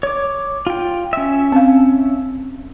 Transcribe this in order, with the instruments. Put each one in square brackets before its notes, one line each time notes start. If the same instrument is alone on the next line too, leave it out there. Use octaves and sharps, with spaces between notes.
[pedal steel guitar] C#5 D6
F4 G5
C#4 E5
[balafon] C4 F5